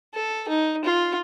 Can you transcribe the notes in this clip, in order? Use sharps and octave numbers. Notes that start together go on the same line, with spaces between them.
A4
D#4
F4